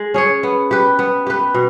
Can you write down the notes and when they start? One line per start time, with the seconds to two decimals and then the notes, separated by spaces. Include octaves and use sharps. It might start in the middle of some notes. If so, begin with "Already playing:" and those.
Already playing: G#3
0.14 C#4 G#4 C#5
0.43 B3
0.71 G4 B4
0.99 B3
1.26 G4 B4
1.54 B2